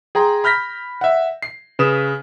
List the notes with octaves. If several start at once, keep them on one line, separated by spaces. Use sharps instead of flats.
G#4 G5 A#5 C6
B5 F6 G6 A#6 B6
E5 F#5
C7
C#3 B4 D#6 E7